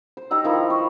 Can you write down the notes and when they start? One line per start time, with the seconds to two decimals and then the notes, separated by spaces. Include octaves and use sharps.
0.17 C5
0.31 D#4 G4 A#5 E6
0.44 D#3 F3 E4 F5
0.70 B4 C5 C#6